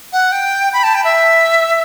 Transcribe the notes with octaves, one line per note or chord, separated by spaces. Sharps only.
F#5
G5
B5
A5
G5
E5